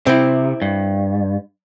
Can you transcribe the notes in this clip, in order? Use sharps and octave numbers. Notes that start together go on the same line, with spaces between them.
C3 C4 E4
G2